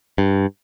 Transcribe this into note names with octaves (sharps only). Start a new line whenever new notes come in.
G2